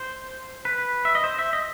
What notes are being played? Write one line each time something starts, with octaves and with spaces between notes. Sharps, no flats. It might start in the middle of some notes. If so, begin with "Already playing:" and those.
Already playing: C5
B4
E5
D#5
C5
E5
D#5